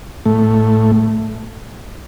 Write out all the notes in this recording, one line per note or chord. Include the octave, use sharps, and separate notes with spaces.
A2 A3